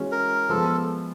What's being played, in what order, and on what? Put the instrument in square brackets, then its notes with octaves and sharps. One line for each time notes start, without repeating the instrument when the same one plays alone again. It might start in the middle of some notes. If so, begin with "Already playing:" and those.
Already playing: [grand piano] E3 G#3 C#4 F#4
[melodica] A#4
[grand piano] F3 G#3 B3 [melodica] A4